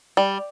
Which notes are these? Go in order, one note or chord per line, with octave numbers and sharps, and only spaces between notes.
G3